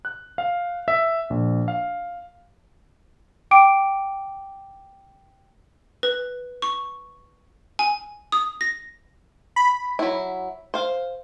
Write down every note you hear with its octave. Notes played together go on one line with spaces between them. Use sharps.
F#6
F5
E5
A#1
F5
G5 D6 D7
B4
C#6
G#5
D#6
A#6
B5
F#3 E4
C5 F5